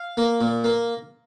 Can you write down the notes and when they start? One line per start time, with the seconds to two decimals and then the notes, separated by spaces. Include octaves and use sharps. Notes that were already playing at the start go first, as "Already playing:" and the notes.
Already playing: F5
0.17 A#3
0.41 A#2
0.64 A#3